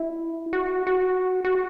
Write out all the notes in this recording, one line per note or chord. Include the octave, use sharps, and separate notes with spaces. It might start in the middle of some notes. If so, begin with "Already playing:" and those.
Already playing: E4
F#4
F#4
F#4